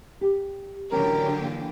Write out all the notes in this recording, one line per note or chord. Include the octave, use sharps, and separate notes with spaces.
G4
A2 D3 E3 F#3 C#4 G4 A#4
E3 A#3